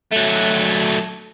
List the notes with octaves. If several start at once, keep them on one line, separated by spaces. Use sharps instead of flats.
F#3 A3